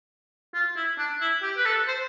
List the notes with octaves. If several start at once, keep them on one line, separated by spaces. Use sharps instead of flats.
F4
E4
D4
E4
G4
B4
A4
C5